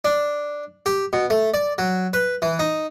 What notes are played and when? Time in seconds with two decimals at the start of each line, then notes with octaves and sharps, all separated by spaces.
0.05 D4
0.86 G4
1.13 B2
1.30 A3
1.54 D5
1.78 F#3
2.13 B4
2.42 E3
2.59 D#4